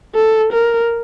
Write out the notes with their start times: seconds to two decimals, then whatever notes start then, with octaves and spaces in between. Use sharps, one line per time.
0.15 A4
0.53 A#4